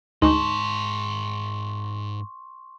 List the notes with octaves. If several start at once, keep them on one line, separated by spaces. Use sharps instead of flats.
D2 G#2 G#3 D#4 A5 C6 C#6